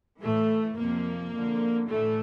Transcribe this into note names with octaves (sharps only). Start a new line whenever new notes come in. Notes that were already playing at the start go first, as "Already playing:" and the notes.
A2 E3 A3
F2 C3 F3 A#3
F2 D3 F3
A2 E3 A3